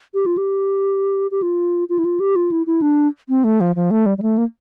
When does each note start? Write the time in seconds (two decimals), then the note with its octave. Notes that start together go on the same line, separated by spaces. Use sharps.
0.14 G4
0.26 F4
0.38 G4
1.31 G4
1.42 F4
1.89 F4
1.99 E4
2.05 F4
2.20 G4
2.36 F4
2.51 E4
2.67 E4
2.82 D4
3.29 C4
3.44 A3
3.61 F3
3.76 F3
3.91 A3
4.06 G3
4.18 G3
4.22 A3
4.38 A#3